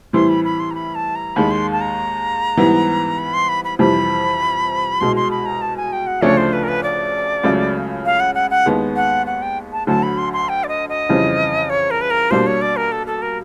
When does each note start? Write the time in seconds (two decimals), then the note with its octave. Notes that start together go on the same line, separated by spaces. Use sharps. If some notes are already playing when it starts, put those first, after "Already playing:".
0.13 A2 E3 G3 C4 C6
0.29 B5
0.44 B5
0.60 C6
0.71 A#5
0.75 B5
0.95 A5
1.15 A#5
1.35 D#2 D#3 G#3 B5
1.51 C6
1.72 A5
1.81 A#5
2.57 G#2 E3 G3 B3
3.19 B5
3.34 C6
3.49 B5
3.64 B5
3.79 F2 C3 E3 G3 B5
5.01 C2 B2 G#3 C6
5.16 C6
5.31 B5
5.46 A#5
5.61 A5
5.77 G#5
5.92 G5
6.07 F#5
6.22 D2 C#3 F3 A3 D4 C#5
6.37 C5
6.53 B4
6.64 A#4
6.68 B4
6.83 D5
7.44 C#2 C#3 F#3 A3
8.05 F5
8.20 F#5
8.35 F#5
8.50 F#5
8.66 D#2 D#3 G#3 B3
8.96 F#5
9.27 F#5
9.42 G5
9.72 A5
9.87 D2 D3 F#3 A5
10.03 B5
10.18 C6
10.33 C6
10.49 G5
10.64 D5
10.68 D#5
10.89 D#5
11.09 F2 C#3 E3 G3 C4
11.70 C#5
11.91 A#4
12.01 B4
12.11 A#4
12.31 B2 G3 A#3 D4 C5
12.47 C#5
12.61 D5
12.76 A#4
12.92 A4
13.07 A4
13.22 A#4